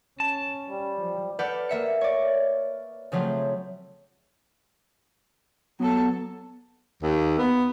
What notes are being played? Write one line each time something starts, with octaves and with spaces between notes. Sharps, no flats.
C#4 A5
G3
F3
A4 B4 D5 F#5 F6 G6
A#3 E5 C#7
C#5 D5
C#3 F3 F#3 A3 C4
F#3 B3 A4
D#2
B3